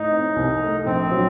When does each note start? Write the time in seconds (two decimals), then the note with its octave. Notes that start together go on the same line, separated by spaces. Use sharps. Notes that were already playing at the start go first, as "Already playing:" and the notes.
Already playing: A2 D#4
0.11 C4
0.36 C2
0.62 A3
0.86 A#1 C4
1.11 F#3